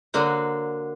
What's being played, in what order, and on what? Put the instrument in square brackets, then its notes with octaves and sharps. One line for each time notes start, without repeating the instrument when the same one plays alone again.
[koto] D3 F#3 A#3 C5